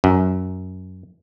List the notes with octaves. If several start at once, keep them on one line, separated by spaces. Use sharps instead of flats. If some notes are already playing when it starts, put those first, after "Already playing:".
F#2